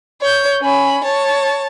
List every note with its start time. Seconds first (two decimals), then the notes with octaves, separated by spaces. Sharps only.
0.21 C#5 G6
0.61 C#4 B5
1.04 C#5 A5